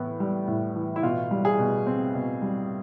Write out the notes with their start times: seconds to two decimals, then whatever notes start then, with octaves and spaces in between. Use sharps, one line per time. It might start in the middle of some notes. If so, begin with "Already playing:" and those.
Already playing: A2 E3 B3
0.20 G3
0.47 A2
0.76 E3
0.96 E4
1.03 B2 F4
1.31 G3
1.45 G#4
1.59 B2
1.87 C4
2.15 B2
2.42 G3